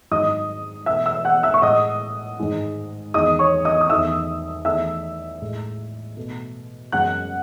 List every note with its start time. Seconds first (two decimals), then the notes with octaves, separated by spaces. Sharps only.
0.11 G#2 D#3 F#3 D#5 D#6
0.86 B2 A3 E5 E6
1.06 E5 E6
1.25 F#5 F#6
1.43 E5 E6
1.54 C#6
1.62 A2 G#3 D#5 D#6
2.39 G#2 D#3 G#3
3.14 E2 D#3 G#3 D#5 D#6
3.39 C#5 C#6
3.65 D#5 D#6
3.81 D#6
3.90 E2 D#3 A3 E5 E6
4.65 E2 D#3 A3 E5 E6
5.41 A2 G#3
6.17 B2 A3
6.92 F#2 C#3 G#3 F#5 F#6